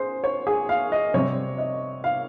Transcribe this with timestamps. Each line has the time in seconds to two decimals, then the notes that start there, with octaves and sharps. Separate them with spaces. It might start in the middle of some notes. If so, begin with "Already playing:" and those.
Already playing: C#4 G#4 C5
0.24 C#5
0.47 G#4
0.69 F5
0.92 D#5
1.14 C3 G3 C4 C#5
1.58 D#5
2.04 F5